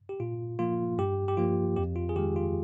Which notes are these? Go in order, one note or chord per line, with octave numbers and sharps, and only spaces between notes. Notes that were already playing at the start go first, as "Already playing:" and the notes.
G4
A#2 F4
F3 A#3 F4
G2 G4
G4
F3 A#3 F4
F2 G4
F4
G#4
D#3 G#3 G4
F4